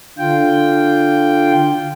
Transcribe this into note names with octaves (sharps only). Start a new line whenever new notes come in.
D3 F4 G5